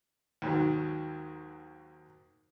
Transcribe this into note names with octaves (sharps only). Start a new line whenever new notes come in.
D#2 G#2 F#3